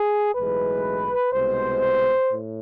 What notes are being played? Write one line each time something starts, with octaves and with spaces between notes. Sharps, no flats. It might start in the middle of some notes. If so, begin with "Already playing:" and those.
Already playing: G#4
B1 A2 E3 G#3 B4
C2 B2 G#3 C5
A2